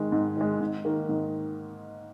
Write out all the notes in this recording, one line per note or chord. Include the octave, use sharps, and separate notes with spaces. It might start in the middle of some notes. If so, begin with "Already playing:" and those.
Already playing: G#2 D#3 G#3
G#2
D#3 G#3
G#2
D#3 A#3
G#2